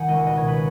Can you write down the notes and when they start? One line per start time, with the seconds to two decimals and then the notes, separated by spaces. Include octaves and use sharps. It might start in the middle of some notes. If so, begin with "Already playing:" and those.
Already playing: D#3 F#5 G#5
0.08 C#2 D#5
0.27 B2 D#5
0.37 C#5
0.48 B4